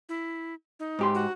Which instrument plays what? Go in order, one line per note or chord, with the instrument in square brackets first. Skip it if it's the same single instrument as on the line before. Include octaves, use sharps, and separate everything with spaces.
[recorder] E4
D#4
[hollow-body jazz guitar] G#2 G4 C6
[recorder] F#4